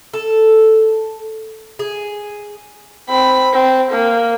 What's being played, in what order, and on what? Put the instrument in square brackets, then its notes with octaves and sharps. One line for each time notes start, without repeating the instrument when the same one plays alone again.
[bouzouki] A4
G#4
[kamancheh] C4 B5
C4
A#3